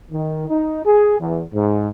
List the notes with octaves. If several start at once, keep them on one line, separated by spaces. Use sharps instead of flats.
D#3
D#4
G#4
E2
G#2